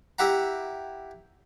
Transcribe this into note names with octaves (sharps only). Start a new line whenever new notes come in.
E4 G4 E5 F#5 A#5